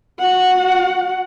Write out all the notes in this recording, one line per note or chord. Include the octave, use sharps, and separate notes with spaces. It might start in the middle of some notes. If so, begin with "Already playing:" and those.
F#4 F#5